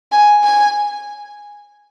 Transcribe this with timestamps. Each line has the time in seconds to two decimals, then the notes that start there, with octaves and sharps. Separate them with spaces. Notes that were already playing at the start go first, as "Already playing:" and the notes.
0.12 G#5
0.44 G#5